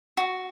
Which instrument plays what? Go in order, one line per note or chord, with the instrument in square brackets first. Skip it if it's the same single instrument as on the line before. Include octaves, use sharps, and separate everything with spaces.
[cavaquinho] F#4